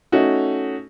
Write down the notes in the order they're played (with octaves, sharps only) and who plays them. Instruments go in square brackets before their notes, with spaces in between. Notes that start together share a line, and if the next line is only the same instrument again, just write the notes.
[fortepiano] A3 C#4 D#4 F#4